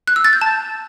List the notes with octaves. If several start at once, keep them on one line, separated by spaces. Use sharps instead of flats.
F#6
E6
A6
G6
A5